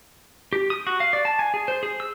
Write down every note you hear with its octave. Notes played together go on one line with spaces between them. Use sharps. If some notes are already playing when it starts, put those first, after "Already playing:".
G4
D#6
F#4
F5
D5
A5
G#5
G#4
C5
G#4
E6